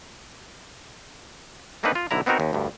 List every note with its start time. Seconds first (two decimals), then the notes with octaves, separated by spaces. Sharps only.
1.83 A3 A#3 C4 D4 D#4 B4
1.95 F4
2.11 B1 D3 E4 A#5
2.26 B3 C4 D#4 F#4 A#4
2.40 D#2
2.53 D2 G2